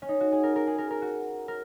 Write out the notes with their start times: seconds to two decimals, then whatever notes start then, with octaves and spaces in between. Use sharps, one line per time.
0.02 C#4
0.09 D#4
0.20 F#4
0.32 G#4
0.43 A#4
0.56 A#4
0.67 G#4
0.78 A#4
0.90 A#4
1.02 F#4
1.48 A#4